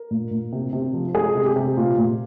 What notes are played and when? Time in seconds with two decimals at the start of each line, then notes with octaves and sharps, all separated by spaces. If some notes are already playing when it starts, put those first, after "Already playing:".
Already playing: A#4
0.11 A#2
0.31 A#2
0.52 C3
0.73 C3
0.94 F3
1.14 G#3 G#4
1.35 C3
1.46 G4
1.56 C3
1.77 A#2 F4
1.97 A#2